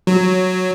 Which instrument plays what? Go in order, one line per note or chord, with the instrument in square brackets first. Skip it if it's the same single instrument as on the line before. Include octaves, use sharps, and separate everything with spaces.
[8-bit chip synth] F#3